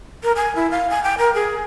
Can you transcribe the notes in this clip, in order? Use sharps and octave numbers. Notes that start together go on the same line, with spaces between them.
A#4
G#5
E4
F5
G#5
G5
A#4
G#4